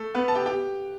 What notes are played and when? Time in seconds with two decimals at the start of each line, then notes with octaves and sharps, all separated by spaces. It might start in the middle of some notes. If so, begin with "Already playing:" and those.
Already playing: A3 A4
0.15 B3 B4
0.28 A5
0.35 G4 G5
0.46 G4 G5